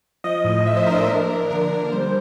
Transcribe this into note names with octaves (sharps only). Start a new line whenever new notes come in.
F3 D#5
A2
F3 E5
C5
D4 A#4
A4
A#3 A#4
F3
D3 A#4
D3
G3 C5